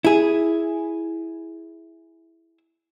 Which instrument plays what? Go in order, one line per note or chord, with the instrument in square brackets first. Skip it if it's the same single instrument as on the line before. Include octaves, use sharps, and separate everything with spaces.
[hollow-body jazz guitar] E4 G#4